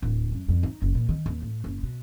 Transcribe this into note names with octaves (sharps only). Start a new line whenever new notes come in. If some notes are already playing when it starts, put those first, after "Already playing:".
D1
F#2
F2
D#4
F#1
A#2
D#3
D#2
A2
F#1
B2